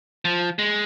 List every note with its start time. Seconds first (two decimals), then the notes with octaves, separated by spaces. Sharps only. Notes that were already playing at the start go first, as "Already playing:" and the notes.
0.25 F3
0.59 G#3